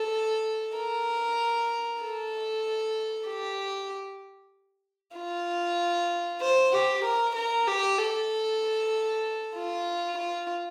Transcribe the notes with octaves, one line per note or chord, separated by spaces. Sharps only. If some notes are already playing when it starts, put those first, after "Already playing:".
Already playing: A4
A#4
A4
G4
F4
C5
G4
A#4
A#4
G4
A4
F4
F4